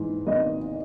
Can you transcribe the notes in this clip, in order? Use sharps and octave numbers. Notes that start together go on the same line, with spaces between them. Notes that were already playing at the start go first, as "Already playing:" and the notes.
Already playing: G#2 E3
G#1 D#5